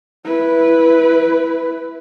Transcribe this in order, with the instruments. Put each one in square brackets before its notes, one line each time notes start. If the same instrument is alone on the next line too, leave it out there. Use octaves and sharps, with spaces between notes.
[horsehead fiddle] E4 B4